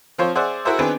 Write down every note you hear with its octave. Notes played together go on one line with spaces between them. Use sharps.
F3 C4 F4 C5 C#5
G#4 C5 D5 E5 F#5
E4 F#4 G#4 A#4 C5 E5
D#3 B3 C4 D4 G#4 B4